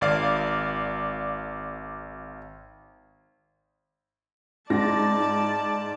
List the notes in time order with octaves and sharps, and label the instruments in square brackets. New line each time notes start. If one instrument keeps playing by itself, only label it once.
[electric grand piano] G#1 D5 F5 D6
[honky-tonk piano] G#2 A#6 [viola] D5 A5